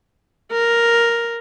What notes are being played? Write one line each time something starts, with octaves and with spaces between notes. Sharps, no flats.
A#4